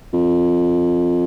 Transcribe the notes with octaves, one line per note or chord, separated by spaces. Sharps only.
F2